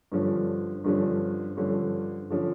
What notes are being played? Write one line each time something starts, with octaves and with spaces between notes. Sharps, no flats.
G2 D3 F3 C#4
G2 D3 F3 C#4
G2 D3 F3 C#4
D3 F3 C#4